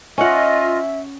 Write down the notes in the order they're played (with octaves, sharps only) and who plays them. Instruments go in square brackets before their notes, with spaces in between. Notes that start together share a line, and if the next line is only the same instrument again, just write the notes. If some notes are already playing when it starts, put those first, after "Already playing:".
[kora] C#4 F#5 [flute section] F4 D#5 [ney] E5